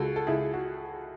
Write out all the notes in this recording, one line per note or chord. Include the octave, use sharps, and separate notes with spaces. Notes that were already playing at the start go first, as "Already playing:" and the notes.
Already playing: C#2 F#4 A4
A4
C#2 E4 G#4
F#4